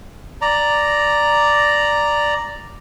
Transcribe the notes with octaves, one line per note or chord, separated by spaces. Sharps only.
D5 A#5